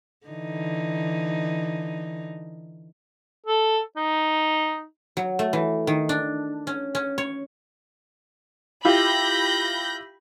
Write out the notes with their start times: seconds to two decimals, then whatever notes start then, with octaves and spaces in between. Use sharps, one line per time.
0.27 D3 E3 D#4
3.46 A4
3.96 D#4
5.17 F#3
5.39 A3
5.53 E3
5.87 D#3
6.09 D4
6.67 C#4
6.95 C#4
7.18 C#5
8.85 E4 F4 G4 B5 G6 A#6